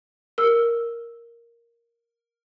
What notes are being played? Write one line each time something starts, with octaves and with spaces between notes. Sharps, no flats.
A#4 E6